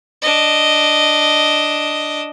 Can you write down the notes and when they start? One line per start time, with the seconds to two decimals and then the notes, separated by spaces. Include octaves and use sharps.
0.22 D4 D#5